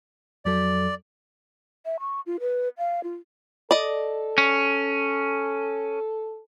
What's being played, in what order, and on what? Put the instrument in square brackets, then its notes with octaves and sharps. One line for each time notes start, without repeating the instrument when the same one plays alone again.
[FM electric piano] F2 F#3 A4 [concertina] D5
[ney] E5
C#6
F4
B4
F5
F4
[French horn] A4 [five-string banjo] D5 D#5
[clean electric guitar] C#4